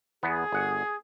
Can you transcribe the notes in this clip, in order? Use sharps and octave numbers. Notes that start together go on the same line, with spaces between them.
E2 B3 G#4
G1 F#5